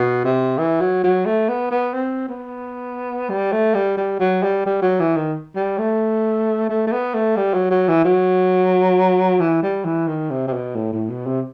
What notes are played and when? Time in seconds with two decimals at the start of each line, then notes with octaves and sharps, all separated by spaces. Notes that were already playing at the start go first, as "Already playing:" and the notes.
Already playing: B2
0.25 C3
0.58 E3
0.80 F#3
1.04 F#3
1.26 A3
1.49 B3
1.71 B3
1.94 C4
2.29 B3
3.29 G3
3.52 A3
3.74 G3
3.97 G3
4.20 F#3
4.43 G3
4.66 G3
4.82 F#3
5.00 E3
5.16 D#3
5.55 G3
5.78 A3
6.69 A3
6.87 A3
6.92 B3
7.14 A3
7.37 G3
7.54 F#3
7.71 F#3
7.88 E3
8.05 F#3
9.40 E3
9.63 G3
9.85 E3
10.08 D#3
10.30 C3
10.48 C3
10.53 B2
10.76 A2
10.93 A2
11.10 B2
11.26 C3